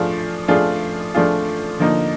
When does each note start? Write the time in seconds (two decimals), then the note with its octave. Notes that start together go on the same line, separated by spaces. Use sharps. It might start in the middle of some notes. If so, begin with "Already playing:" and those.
Already playing: F3 A3 D4 F4 G#4
0.48 F3 A3 D4 F4 G#4
1.14 F3 A3 D4 F4 G#4
1.79 D3 F3 A#3 D#4